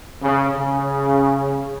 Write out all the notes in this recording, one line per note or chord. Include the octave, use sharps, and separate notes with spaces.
C#3
C#3